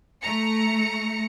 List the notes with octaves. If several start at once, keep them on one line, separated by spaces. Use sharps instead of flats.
A3 A#5 C#7